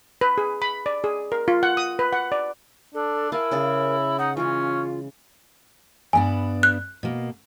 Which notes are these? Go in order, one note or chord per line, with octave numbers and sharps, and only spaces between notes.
B4
G#4
B5
D5
G#4
A#4
F4
F#5
D#6
B4
F#5
D5
D4 A4
E4 A#4 F5 G#5 A5
C#3 G#4 D5
D#4 F#5
E3 G#3 C#4 F4
G2 B3 D4 G#5
F#6
B2 A#3